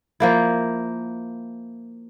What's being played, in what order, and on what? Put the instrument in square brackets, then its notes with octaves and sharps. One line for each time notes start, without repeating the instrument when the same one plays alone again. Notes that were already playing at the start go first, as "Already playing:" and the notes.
[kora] F3 A#3 E4